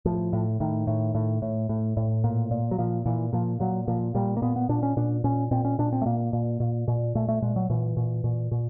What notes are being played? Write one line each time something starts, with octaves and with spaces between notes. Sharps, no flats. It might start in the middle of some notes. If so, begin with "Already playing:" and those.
A2 F3
A2
A2 D#3
A2
A2
A2
A2
A2
A#2
A#2
F#3
A#2 F3
A#2 E3
A#2 F3
A#2 F#3
A#2 F3
A#2 G3
A#3
A#2 B3
B3
A#2 D4
C#4
A#2 D4
A#2 C#4
A#2 C4
C#4
A#2 D4
C4
A3
A#2 A#3
A#2
A#2
A#2
A#2 A3
A3
A#2 G#3
F#3
A#2 E3
A#2
A#2
A#2